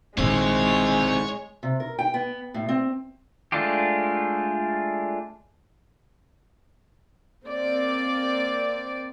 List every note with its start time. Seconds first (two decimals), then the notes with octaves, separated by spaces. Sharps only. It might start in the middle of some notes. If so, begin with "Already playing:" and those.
0.18 A#1 D#3 G#3 C4 E4 C#5
1.63 C3
1.80 A#4
1.99 G5
2.14 B3
2.54 A2
2.69 C4
3.52 G#3 A3 D4 F4 G4
7.44 A#3 C4 D5